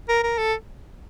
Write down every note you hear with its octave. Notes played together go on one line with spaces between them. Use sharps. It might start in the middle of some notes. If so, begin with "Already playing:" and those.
A#4
A#4
A4